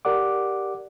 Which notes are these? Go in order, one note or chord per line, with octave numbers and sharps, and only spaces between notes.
G4 A#4 D5 F#5 D6